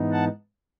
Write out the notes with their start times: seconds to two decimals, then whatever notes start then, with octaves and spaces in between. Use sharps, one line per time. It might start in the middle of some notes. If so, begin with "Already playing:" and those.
Already playing: G#2 E3 B3 D#4
0.12 F#5 A5